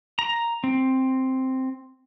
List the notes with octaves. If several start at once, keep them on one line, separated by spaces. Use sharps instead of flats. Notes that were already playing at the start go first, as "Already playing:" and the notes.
A#5
C4